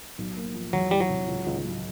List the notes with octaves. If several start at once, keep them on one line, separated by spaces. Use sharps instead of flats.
B1
A#3
F3
E1 F#3
E3 G3
F#3
C3
C#2
C#2
F#3